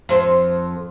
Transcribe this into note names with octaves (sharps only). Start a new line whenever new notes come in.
F2 C5